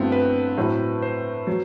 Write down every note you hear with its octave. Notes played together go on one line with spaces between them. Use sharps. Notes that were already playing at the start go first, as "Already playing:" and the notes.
Already playing: G1 G2 F#3 A3 B3 C4 E4
B4
A2 F#3 C4 E4
C5
F#3